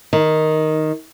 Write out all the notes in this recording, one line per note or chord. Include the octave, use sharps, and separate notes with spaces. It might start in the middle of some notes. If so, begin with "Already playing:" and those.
D#3